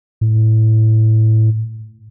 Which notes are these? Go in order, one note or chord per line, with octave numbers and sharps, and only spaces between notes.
A2